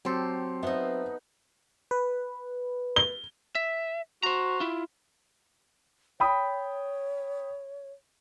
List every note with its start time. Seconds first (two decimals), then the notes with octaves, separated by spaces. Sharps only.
0.05 F#3 C4 G4 A4 C6
0.63 B3 D#4 C5 E5
1.91 B4
2.96 G7
3.55 E5
4.23 F#4 C5 A#5
4.60 E4 F4
6.20 C#5 G5 B5 D#6